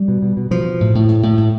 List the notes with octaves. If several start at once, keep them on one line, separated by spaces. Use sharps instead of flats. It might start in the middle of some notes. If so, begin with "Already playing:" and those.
Already playing: G3
B2
B2
B2
B2 F3
B2
A2
A2
A2
A2
A2